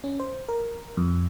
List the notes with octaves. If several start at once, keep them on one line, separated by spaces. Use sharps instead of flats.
C#4
C5
A#4
F2